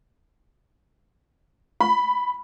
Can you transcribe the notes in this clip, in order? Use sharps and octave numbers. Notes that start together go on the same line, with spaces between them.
B5